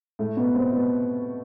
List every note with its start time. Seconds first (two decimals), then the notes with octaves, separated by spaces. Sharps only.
0.19 A2 A3
0.37 B2 B3
0.54 C3 C4
0.73 B2 B3